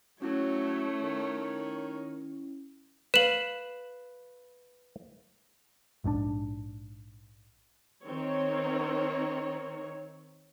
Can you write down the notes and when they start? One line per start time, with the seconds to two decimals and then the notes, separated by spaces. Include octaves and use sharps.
0.22 F#3 A3 C#4 E4 C#5
1.02 D#3
3.14 B4 F5 E7 F#7
6.04 A#1 G#2 D3 D4
8.05 D#3 C4 C#5